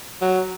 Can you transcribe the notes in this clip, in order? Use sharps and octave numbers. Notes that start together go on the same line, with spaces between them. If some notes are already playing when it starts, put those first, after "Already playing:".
F#3